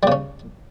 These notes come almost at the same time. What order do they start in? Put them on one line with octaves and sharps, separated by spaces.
G3 C#3 C#4